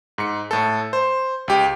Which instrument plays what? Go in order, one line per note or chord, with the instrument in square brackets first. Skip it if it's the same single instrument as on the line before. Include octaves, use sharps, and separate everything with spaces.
[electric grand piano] G#2 C#7
A2 A4
C5
C#2 G4